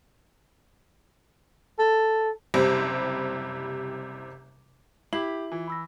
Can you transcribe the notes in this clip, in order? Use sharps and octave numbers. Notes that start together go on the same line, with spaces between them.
A4
F#1 C3 G3 C5
E4 G4 C7 F#7
E3 F4
B5 E6 A#6